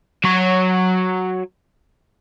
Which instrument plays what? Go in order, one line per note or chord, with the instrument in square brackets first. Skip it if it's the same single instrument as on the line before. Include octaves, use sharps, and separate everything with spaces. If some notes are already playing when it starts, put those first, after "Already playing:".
[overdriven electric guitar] F#3 C#5